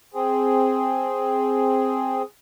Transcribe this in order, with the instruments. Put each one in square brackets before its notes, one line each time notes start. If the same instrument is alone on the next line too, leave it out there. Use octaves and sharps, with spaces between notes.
[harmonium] C4 G#4